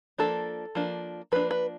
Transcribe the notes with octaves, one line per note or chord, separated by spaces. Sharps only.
F3 A#3 D4 A4
F3 A#3 D4
F3 A#3 D4 B4
B4